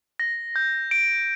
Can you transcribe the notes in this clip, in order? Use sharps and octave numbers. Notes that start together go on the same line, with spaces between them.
A#6
G6
D7